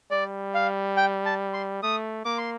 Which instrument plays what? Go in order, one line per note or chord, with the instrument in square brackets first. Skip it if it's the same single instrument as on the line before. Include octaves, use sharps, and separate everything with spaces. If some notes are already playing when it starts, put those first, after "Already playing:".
[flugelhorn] G3 [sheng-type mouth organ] D5
[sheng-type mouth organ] F5
G5
A5
C6
[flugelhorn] A3 [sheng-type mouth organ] D#6
[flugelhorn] A#3 [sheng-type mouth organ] D6
[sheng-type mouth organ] C6